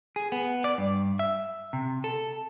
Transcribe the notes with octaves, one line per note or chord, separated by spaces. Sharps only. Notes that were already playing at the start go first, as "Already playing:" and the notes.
G#4
B3
D5
G2
E5
C3
A4